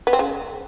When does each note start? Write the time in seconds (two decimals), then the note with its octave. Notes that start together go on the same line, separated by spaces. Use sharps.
0.07 B3
0.13 C4
0.19 C#3